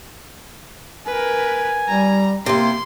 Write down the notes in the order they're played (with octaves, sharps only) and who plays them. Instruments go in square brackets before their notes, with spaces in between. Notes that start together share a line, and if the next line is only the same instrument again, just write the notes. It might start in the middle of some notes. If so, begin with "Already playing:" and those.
[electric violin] A#4 B4 [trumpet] G#5
[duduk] G3 [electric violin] A#5
[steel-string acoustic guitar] C3 E4 [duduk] A#3 [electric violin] C6